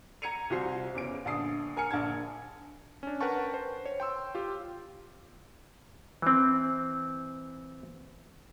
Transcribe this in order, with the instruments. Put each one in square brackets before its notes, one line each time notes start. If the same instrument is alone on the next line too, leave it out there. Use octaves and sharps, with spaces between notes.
[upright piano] A#5 G#6 C#7 D#7 F7
C2 F4 F#4 C5 C7
E2 C#3 D7
A#1 D3 A5 D#6 C7
A#4 G#5 F6 C#7
A#1 D3 A5 G#6
[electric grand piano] C#4 D4
A#4 B4 F#5 G5 A5 C#6
C5
C#5
G5 C6 E6
F4 G4
[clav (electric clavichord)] E3 C4